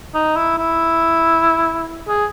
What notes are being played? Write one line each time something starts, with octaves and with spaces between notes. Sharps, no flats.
D#4
E4
E4
G#4